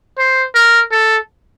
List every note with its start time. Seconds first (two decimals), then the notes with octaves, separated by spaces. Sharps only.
0.18 C5
0.55 A#4
0.91 A4